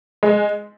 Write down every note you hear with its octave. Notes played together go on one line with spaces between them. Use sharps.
G#3